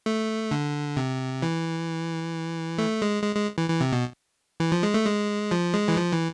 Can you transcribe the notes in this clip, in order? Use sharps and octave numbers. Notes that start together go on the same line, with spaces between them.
A3
D3
C3
E3
A3
G#3
G#3
G#3
E3
E3
C3
B2
E3
F3
G#3
A3
G#3
F3
G#3
E3
F3
E3